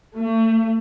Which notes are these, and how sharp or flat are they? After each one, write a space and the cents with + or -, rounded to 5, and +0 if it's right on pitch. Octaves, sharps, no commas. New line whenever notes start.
A3 +35